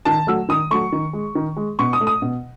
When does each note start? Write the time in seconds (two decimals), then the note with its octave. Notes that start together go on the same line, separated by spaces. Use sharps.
0.05 D#3 A5
0.27 F#3 A3 E6
0.49 D#3 D#6
0.71 F#3 A3 C#6
0.92 D#3
1.13 G#3
1.35 D#3
1.56 G#3
1.79 B2 C#6
1.93 D#6
2.01 A3
2.07 D#6
2.22 B2